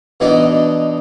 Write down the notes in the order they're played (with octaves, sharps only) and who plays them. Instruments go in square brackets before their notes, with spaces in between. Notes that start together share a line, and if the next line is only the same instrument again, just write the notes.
[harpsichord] B2 E3 B3 D4 D#4